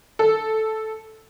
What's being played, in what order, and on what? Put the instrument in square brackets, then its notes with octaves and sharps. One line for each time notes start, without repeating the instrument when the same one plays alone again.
[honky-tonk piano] A4